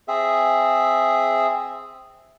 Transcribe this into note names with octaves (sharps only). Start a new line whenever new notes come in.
C4 G#4 E5